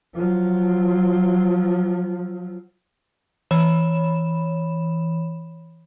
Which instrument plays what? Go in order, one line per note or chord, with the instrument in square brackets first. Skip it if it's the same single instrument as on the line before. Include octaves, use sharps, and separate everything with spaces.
[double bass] F3 F#3
[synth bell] E3 C#5 B5 E7